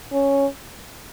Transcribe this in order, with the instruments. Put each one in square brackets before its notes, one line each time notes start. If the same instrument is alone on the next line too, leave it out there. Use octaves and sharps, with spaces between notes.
[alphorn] C#4